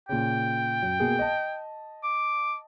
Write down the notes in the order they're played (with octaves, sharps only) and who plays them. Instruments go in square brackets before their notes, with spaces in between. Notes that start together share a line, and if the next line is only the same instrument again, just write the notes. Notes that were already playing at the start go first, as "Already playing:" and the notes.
[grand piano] A#2 C#3 [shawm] G5
[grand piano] F#2
B2 A#3 G#4
D#5 A5
[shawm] D6